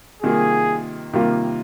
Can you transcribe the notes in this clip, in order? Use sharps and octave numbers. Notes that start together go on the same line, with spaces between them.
C3 D#3 G3 A#3 F4 G#4
C3 D#3 G3 A#3 F4